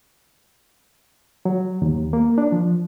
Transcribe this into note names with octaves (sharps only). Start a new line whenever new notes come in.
F#3
D#2
A#3
D4
F3